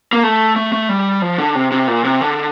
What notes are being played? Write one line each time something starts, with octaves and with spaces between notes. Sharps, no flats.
A#3
A3
A3
A3
G3
F3
D3
C3
C3
A#2
C3
D3